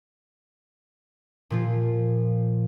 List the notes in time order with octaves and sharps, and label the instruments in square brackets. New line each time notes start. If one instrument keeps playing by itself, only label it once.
[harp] A#2 F3 F4